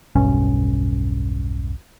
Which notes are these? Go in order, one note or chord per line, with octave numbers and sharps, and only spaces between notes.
E1 B1 G2 C#4